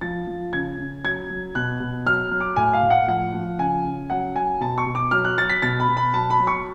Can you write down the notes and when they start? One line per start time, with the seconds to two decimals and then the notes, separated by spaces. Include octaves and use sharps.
0.01 F3 A6
0.27 F3
0.53 C#3 G#6
0.78 C#3
1.04 F#3 G#6
1.30 F#3
1.55 B2 F#6
1.80 B2
2.06 F#3 F6
2.31 F#3
2.41 D6
2.56 A2 G#5
2.73 F5
2.83 A2
2.90 F#5
3.07 F3 F#5
3.34 F3
3.59 C#3 G#5
3.84 C#3
4.10 F#3 F#5
4.35 F#3 G#5
4.61 B2 A5
4.78 C#6
4.86 B2
4.95 D6
5.11 F#3 F6
5.25 F#6
5.37 F#3 A6
5.50 B6
5.62 B2 A6
5.80 B5
5.89 B2
5.97 B5
6.13 F#3 A5
6.30 B5
6.39 F#3
6.47 C#6